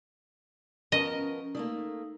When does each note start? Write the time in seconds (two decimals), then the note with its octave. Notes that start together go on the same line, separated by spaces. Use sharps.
0.92 F3 B3 C#4 A#4 D#5
1.55 G3 A3 A#3 D#4